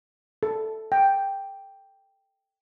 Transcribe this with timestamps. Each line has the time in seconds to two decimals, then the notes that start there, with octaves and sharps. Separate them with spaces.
0.43 A4
0.92 G5